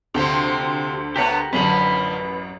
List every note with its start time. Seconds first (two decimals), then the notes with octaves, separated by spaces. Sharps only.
0.14 D2 C3 F3 G4 C5
1.16 A3 B3 G4 A#4 C#5 F#5
1.53 A1 F#2 D3 F3 C#4 B4 B5